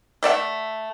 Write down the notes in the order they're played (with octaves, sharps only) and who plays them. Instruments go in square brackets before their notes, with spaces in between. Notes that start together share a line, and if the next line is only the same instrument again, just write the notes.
[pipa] A3 D5 E5 F#5